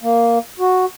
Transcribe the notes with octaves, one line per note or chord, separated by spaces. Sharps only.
A#3
F#4